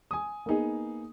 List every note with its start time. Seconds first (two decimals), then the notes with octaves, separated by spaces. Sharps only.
0.11 G#5 D#6
0.46 A#3 B3 D#4 G#4